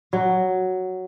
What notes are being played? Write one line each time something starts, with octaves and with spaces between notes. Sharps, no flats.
F#3